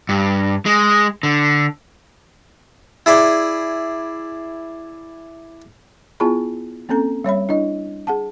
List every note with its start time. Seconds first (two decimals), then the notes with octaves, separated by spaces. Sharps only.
0.09 G2
0.66 G#3
1.23 D3
3.06 E4 G#4 D5
6.20 B3 E4 F4 G#4 A5 B5
6.89 A#3 C4 C#4 A4 A#5
7.24 G3 C#5 E5 B5
7.49 D4 E4 D#5
8.07 G#4 F#5 A5